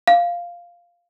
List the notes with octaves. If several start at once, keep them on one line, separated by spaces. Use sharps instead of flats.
F5